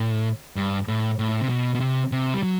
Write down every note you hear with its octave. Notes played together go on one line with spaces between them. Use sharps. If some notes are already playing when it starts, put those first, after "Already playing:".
Already playing: A2
G2
A2
A2
C3
B2
B2
C3
C3
G3
F#3